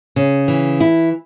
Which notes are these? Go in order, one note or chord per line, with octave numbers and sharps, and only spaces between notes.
C#3
E3
E4